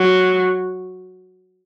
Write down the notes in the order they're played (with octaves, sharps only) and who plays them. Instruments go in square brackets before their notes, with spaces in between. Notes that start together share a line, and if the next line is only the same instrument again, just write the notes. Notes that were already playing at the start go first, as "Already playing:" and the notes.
Already playing: [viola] F#3